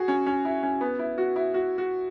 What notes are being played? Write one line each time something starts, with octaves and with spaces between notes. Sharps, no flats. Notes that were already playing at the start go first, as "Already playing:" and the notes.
Already playing: F#4 G#4
C#4
C#4
E4
C#4
B3
E4
F#4
E4
F#4
F#4